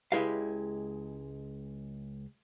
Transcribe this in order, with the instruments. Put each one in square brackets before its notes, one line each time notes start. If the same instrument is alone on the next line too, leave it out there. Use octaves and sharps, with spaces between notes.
[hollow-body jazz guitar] C#2 G#3 E4 G4 B4 F5